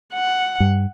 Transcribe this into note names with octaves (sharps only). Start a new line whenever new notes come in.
F#5
G2